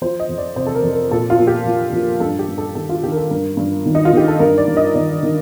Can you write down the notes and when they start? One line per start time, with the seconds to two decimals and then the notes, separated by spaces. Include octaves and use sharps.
0.02 F3 C5
0.20 D#5
0.29 F2
0.38 D5
0.56 C3 C5
0.67 A4
0.75 A#4
0.83 F2
0.93 A#4
1.11 A#2 A4
1.30 F4
1.39 A#2
1.47 G4
1.66 F3
1.93 F3
2.20 G2 A4
2.39 G4
2.48 G2
2.58 A4
2.75 D#3 A4
2.89 F4
3.03 D#3 G4
3.12 A#4
3.17 A4
3.31 G2 A#4
3.57 G2
3.86 D#3
3.95 D#4
4.05 F4
4.13 D#3 G4
4.28 A4
4.39 G2 A#4
4.58 D5
4.68 G2
4.77 D#5
4.95 D#3 D5
5.23 D#3